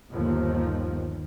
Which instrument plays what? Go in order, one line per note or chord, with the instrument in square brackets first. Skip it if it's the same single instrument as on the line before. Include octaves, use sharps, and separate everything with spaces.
[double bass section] G1 D#2 D#3 F3